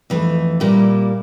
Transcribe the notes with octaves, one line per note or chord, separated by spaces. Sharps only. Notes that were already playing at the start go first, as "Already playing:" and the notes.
F2 E3 A3
A#2 G3 A#3 E4